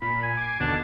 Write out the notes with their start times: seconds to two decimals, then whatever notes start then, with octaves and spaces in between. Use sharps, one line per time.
0.02 A#2 B5
0.23 G#5
0.37 D6 G#6 C7
0.60 D#2 B2 D3 D4